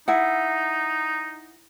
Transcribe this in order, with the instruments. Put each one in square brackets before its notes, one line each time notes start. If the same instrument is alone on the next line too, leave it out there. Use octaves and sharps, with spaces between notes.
[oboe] D#4 [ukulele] E4 F#5